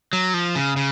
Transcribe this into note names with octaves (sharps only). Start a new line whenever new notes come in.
F#3
F3
C#3
C#3